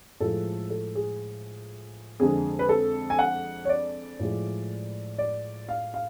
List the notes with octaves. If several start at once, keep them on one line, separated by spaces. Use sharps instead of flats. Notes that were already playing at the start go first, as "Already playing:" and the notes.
A2 F3 G#3 A4
A4
G#4
F2 D3 G#3 G#4
B4
A4
G#5
F#5
C#5
D5
A2 F3 G#3
D5
F5
F5